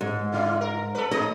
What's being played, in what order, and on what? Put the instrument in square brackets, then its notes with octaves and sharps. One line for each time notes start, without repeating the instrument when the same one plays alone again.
[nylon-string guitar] G#2
[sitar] C#3 E4 F4
A#4
A4 B4
[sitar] G#3 D#4 [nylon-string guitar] D#5